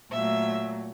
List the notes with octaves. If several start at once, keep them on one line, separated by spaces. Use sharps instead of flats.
A#2 F#3 A3 E5